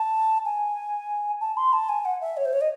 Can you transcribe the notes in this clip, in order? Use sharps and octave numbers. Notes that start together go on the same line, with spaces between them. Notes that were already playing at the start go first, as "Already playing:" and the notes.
Already playing: A5
G#5
A5
C6
A5
G#5
F#5
E5
C#5
C5
C#5
D#5